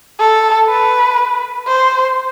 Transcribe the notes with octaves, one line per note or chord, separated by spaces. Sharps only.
A4
B4
C5